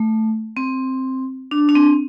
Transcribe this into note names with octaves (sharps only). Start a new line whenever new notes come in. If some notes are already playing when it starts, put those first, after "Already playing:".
Already playing: A3
C4
D4
D4
C4